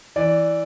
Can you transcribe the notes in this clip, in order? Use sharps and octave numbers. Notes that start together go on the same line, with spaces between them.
E3 D5